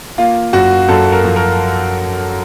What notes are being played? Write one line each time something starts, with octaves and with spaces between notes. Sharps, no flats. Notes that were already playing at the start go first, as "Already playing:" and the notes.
A#3 F4
F#2 F#4
F#2 A4
A#4
F3
A#4